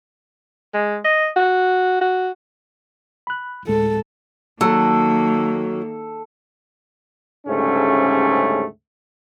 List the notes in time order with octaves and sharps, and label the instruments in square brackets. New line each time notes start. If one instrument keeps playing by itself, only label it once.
[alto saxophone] G#3
D#5
F#4
F#4
[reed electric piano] B5 F#6
[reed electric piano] D2 A2 G#3 [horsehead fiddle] A4
[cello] D#3 A#3 [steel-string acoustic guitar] F#3 [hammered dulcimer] A4
[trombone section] D2 G#2 C#3 G3 A3 C#4